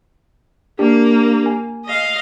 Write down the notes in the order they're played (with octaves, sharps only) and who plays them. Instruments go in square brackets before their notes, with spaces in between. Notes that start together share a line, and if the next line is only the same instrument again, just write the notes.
[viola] A#3 [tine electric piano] D4 G4
[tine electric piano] G#5
[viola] D#5 F5